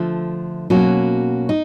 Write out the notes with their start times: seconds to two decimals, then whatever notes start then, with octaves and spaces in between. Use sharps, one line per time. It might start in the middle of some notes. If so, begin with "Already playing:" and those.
Already playing: D3 F3 A3
0.70 B2 F#3 A#3 C#4 F#4
1.49 D#4